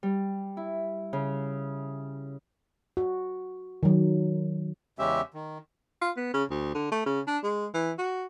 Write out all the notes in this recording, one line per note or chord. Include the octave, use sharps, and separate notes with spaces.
G3
E4
C#3
F#4
D#3 F#3
E2 C#3 G#3 C#4 G4 E5
D#3
F4
B3
C#3
D2
D3
A3
C#3
D4
G#3
E3
F#4